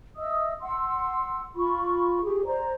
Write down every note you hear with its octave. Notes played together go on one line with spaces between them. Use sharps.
D#5 E5 D#6 E6
F#5 C6 E6
F4 B5 C#6
G4 G#4
C5 D5 A#5